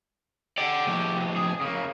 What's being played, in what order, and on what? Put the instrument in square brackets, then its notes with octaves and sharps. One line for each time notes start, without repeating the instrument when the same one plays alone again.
[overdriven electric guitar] G4 [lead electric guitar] D5 F#5
[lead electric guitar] A2 F3
[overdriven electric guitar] G#4
C#3 A#3